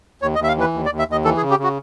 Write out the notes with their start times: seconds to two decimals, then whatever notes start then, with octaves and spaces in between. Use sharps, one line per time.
0.22 D#2 C#5
0.35 D#5
0.39 D#2 E5
0.48 F5
0.56 E3 B4
0.73 D#2
0.86 D5
0.90 D#2
0.99 E5
1.08 D#2 D#5
1.25 E3 A4
1.37 G#4
1.42 C#3
1.50 G4
1.59 C#3 F#4